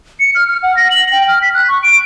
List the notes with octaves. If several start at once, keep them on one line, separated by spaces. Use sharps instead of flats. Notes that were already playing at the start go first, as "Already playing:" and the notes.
C#7
F6
F6
F#5
A#6
F#7
G5
F6
B6
F#6
C#6
D7